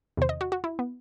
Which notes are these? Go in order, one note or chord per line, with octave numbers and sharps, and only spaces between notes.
E2 C3 D#3 C5
D#5
F#4
F#4
E4
B3